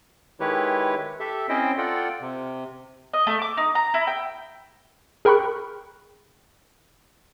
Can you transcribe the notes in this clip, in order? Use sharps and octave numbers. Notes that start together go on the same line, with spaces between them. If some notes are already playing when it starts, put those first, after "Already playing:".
D#3 G#3 E4 G4 B4 C#5
G4 A4 E5
C4 C#4 E4 C5 D#5 G5
F4 A4 D5 F#5 G5
C3
D#5
A3
D6
D#4
A#5
E4
G5
G#4 A#4 G5 B5 C#6 F#6